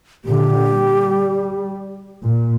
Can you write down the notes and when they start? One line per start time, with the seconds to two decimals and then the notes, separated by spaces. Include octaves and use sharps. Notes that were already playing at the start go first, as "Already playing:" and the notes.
0.25 A#2 D3 G4
0.66 G3
2.23 A#2